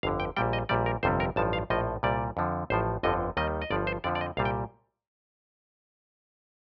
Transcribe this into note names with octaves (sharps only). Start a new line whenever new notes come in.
G1 F2 D3 F5
G5
A#1 A#2 G3 G5
D#5
A#1 A#2 G3 D5
A#4
G1 F2 C3 G3 C5
A#4
A1 G2 F3 A5
F5
A#1 A2 F3 D#5
C2 A#2 G3 D5
F2 D3 F3
A1 A2 F3 C5
G1 F2 D3 F3 D#5
D#2 D#3 G3 D#5
D#5
G1 G2 F3 D5
C5
F2 D3 F3 D5
D5
D#5
C2 A#2 G3 F5
G5